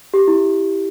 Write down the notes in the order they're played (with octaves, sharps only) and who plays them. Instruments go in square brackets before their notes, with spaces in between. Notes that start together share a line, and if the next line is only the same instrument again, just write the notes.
[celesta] G4
E4